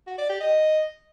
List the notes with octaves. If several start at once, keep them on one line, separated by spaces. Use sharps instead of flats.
F#4
D5
G4
D#5